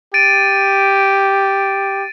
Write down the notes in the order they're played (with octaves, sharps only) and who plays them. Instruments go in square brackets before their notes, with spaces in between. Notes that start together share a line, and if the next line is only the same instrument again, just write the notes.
[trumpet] G4 [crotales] A6 D7 D#7